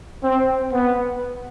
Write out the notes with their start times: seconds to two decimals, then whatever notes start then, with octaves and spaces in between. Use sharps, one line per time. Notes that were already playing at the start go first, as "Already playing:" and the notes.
0.23 C4
0.73 B3